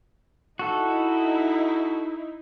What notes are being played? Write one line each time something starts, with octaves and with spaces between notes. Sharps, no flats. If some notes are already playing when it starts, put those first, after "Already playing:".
D#4 E4 F#4 A4